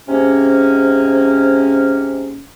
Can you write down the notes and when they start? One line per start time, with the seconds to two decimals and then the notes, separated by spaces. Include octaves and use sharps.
0.08 G#2 C3 A#3 C#4